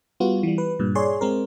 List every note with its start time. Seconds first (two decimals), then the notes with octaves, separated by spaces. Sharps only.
0.20 G3 B3 F4 F#4
0.43 E3 G3
0.58 B4
0.79 G2 A#2
0.95 G#4 C#5 D5 C6
1.21 G#3 C4 A#4